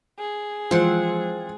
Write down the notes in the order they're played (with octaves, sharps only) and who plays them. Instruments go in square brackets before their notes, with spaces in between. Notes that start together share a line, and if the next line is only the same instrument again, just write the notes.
[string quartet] G#4
[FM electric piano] E3 F3 G#3 [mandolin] C4 F#5 [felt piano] F4